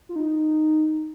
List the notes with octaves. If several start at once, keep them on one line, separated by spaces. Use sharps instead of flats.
F4
D#4